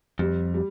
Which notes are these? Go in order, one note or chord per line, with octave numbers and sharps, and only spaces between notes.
F2 G3
G3